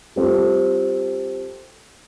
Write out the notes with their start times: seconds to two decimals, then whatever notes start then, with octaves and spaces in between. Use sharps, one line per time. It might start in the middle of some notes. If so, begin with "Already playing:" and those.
0.16 G3 C4 F4 A4